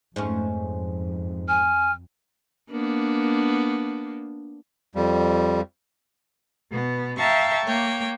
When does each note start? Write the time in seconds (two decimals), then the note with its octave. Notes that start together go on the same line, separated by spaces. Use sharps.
0.16 F2 G#2 A3 C#4
1.48 G#5 F6
2.71 A#3 B3 D4
4.95 F2 G3
6.71 B2 B3
7.17 E5 F5 G5 A5 A#5 C#6
7.65 A#3 C#5 G5